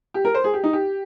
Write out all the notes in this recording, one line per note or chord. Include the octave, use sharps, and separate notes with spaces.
G4
A#4
C5
G#4
G4
D#4
G4